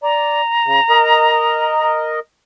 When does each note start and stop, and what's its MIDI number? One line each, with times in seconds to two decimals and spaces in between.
0.03 0.41 74
0.03 1.92 82
0.65 0.80 49
0.90 2.19 70
0.90 2.19 75